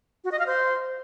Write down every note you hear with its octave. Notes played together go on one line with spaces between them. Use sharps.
F#4
D#5
F5
C5